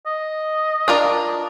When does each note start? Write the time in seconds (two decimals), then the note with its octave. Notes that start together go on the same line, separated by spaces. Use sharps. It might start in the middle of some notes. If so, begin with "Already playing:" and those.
0.06 D#5
0.88 D4 F4 A#4